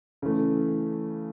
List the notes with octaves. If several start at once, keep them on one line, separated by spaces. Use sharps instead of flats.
C#3 E3 A3